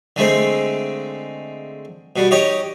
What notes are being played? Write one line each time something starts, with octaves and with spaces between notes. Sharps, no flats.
D3 G#3 A3 C4
B2 G3
D#4 G4 C#5 D#5